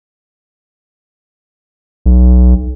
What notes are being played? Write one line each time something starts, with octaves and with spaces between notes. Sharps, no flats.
B1